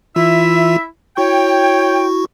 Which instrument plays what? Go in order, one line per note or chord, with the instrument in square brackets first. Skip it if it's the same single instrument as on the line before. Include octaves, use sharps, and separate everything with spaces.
[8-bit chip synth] E3 F4 [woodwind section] E4 E5
[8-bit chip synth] E4 F#4 C#6 [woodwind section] C#5 G5